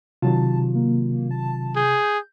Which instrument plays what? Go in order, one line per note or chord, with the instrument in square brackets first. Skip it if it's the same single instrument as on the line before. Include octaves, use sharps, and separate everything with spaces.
[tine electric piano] C3 [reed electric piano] D#3 F#3 F4 [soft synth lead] A5
[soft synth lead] A#3
A5
[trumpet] G#4 [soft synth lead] G6